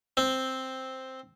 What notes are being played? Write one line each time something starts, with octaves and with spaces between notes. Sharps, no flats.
C4